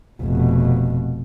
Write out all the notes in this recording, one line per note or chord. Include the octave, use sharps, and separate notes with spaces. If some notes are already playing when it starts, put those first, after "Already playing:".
F1 B2